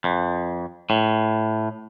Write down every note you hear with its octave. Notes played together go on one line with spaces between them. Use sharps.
F2
A2